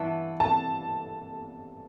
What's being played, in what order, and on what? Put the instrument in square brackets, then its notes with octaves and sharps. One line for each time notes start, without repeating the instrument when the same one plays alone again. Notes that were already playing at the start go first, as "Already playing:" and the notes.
Already playing: [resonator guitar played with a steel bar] G2 E3 B3 E4 [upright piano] A5
[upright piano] A5